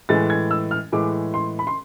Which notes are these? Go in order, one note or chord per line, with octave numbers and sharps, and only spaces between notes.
A2 E3 G#3 A6
G#6
E6
F6
A2 E3 G#3 D6
C6
B5
C6